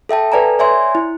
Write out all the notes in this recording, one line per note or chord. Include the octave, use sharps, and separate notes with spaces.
A4 E5 G5 A5
A4 B4 D5 G#5 A#5
C#5 D5 E5 G#5 C6
E4